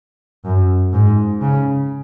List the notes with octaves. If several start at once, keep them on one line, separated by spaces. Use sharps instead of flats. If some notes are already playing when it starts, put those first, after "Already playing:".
F#2
G#2
C#3